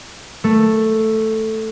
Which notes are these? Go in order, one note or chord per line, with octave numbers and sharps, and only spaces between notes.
A3